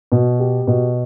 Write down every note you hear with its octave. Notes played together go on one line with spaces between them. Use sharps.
B2
G4
B2